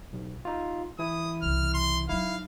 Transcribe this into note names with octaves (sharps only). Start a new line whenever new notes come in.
B1
D#4 F4
E3 E4 D#6
C2 C#3 F6
C6
F#3 D#4 E4 F5